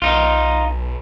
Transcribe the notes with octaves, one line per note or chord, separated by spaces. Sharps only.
B1 D#4 F4